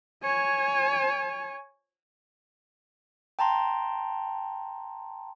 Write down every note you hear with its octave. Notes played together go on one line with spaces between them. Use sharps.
C#5 G#5
G5 A5 A#5 C6